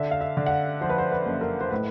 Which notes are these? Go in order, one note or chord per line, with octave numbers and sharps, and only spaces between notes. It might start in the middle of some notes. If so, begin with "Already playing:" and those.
Already playing: D3 E5
F5
E5
D3
F#5
F5
F3 C5
B4
C5
B4
F#1
A#4
C5
A2 B4